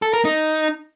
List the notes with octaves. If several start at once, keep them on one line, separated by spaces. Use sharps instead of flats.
A4
A#4
D#4